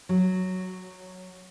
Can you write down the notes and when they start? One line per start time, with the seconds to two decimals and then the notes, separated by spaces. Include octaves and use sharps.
0.09 F#3